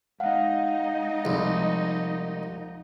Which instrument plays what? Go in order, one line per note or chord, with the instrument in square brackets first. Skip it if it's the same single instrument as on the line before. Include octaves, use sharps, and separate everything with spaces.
[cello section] G#3 D#4 D#5 [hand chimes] F5 F#5
[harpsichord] C2 [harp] F3